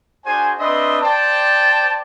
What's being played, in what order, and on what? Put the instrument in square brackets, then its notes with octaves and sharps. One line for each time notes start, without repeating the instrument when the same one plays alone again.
[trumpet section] D4 F#4 G#4 C5 G#5
C4 D4 B4 D#5 E5 C6
C5 D5 G5 A5